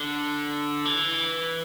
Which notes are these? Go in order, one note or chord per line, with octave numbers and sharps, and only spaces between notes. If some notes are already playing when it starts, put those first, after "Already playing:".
Already playing: D3
E3